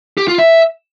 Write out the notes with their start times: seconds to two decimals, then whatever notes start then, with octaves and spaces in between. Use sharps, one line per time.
0.18 G4
0.28 F4
0.38 E5